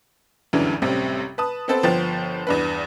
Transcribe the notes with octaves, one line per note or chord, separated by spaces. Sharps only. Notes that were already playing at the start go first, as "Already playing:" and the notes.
F#1 D2 G2 C#3 E3 F#3
A1 F#2 C3 G3 C4
B4 A5 D#6
B3 C4 A4 B4 C5
G1 F3 B3 C5 G5 A6
E2 G2 B4